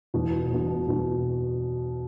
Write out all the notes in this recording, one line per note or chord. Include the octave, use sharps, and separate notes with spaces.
E1 E2 B2
E1 E2 B2
B2